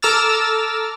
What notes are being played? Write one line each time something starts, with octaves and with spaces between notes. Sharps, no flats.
A4 A#5 D6 E6 F6 A6